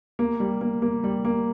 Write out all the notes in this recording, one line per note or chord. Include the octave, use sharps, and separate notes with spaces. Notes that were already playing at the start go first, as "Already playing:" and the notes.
A#3
G3
A#3
A#3
G3
A#3